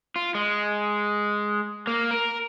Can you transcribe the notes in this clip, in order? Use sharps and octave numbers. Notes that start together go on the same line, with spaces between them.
F4
G#3
A#3
A#4